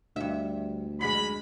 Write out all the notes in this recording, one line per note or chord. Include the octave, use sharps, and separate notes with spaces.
D2 G2 E5
F#2 G#3 B5